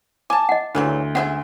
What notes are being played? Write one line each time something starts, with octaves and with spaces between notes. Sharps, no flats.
G#5 A5 D6
D#5 F#5
D2 C#3 E3 F#3
G#3 C#4 C5 E5 F#5